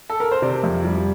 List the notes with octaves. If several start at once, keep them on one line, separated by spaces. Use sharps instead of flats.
A4
A#4
C5
C3 D5
F2
G3